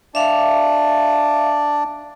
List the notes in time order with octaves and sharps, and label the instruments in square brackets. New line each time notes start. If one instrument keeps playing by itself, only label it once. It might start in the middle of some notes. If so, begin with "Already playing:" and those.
[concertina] D4 D5 [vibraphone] E5 F5